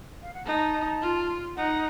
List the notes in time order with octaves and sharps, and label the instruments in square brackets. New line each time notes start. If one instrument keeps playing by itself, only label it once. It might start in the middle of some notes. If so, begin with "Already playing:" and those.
[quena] F5
F#5
[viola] D#4 [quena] A5
[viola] F4
[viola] D#4 [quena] F#5